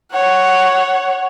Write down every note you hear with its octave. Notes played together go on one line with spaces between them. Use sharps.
C#5 F#5